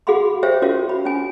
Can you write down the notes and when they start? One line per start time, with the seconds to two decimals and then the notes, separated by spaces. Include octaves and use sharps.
0.07 F#4 G#4 F5 F#5 B5 C6
0.43 G4 C5 C#5 E5 F5 G5
0.62 C#4 F4 F#4 A#4 C#5 F5
0.89 B5
1.05 C#4 G#5